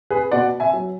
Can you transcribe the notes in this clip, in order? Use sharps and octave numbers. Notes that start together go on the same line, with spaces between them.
G#4 B4
B2 D5 F#5
E5 G#5
F#3